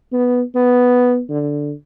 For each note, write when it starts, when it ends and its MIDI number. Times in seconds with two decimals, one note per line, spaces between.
0.12 0.42 59
0.55 1.21 59
1.29 1.72 50